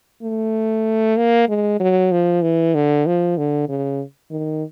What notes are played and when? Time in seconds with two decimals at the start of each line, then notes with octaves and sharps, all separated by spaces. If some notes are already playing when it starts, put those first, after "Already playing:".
0.23 A3
1.17 A#3
1.49 G#3
1.80 F#3
2.12 F3
2.42 E3
2.75 D3
3.06 F3
3.38 D3
3.69 C#3
4.31 D#3